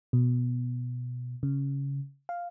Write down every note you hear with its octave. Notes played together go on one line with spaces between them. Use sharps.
B2
C#3
F5